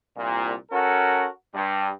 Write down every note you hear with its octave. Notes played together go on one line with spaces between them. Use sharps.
C2 A#2
C#4 F#4 A4 A#4
G2